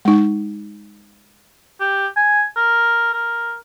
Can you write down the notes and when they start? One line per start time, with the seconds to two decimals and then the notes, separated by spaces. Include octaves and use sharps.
0.05 G#3 D#4
1.80 G4
2.17 G#5
2.56 A#4
3.13 A#4